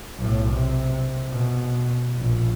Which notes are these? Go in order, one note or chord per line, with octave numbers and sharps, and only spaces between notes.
B1 A2
C3
B2
A#1